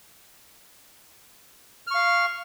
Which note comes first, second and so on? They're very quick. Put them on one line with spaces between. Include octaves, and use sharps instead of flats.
F6 C#6 F5